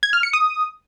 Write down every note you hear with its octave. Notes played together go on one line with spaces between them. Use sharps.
G#6
F6
C#7
D#6